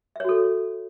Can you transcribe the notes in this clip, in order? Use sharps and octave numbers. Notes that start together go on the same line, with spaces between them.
F#4 A4 C#5 E5